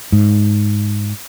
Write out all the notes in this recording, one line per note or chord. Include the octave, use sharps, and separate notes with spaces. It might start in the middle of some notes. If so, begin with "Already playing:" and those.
G#2